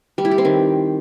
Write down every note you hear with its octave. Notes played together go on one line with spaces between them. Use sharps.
G3
E4
G4
C4
D#3